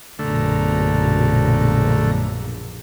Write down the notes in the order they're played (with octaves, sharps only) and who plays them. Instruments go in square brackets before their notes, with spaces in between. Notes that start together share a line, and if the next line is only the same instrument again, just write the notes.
[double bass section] A#1 [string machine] F#2 B2 A#5 [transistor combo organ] D3 A3